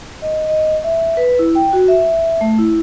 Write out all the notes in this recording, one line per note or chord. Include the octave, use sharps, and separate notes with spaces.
D#5
D#5
E5
B4
E4
G5
F#4
E5
A3
E4